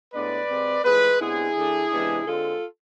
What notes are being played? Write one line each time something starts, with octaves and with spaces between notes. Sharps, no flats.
A2 G#3 B3 D4 B4 D5
C3 G#3 C4
A2 F3 G#3 G#4 B4
C3 G#3 B3 D4 E4 G#4
D3 A3 D4
C3 E3 G#3 B3 D4
D3 G#3 C4 F4 A4